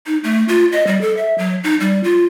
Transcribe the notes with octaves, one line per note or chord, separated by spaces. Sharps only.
D#4
A3
F4
D#5
G3
A4
E5
F#3
D#4
G3
F4